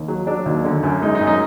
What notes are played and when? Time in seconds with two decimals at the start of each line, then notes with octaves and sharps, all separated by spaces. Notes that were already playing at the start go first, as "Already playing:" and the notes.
Already playing: D#2
0.08 F#3
0.27 F#3 D4
0.46 D#2
0.64 D3
0.83 F#2
1.02 G#3 D#4
1.15 D#4
1.21 F#2
1.27 D#4